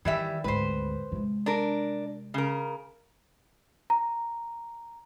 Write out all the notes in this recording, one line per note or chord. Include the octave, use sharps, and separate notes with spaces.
D#3 E3 G3 E5
G#1 D2 B4 C5
C3 G#3
D4 A#4
C#3 A#4
A#5